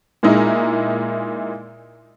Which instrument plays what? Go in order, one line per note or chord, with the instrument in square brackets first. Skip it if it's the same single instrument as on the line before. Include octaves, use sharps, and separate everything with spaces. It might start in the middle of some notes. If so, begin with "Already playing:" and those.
[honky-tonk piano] A#2 G#3 D#4 E4